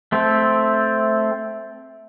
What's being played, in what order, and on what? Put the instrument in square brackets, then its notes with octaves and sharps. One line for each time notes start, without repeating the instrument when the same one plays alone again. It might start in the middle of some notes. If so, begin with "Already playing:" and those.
[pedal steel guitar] A3 C4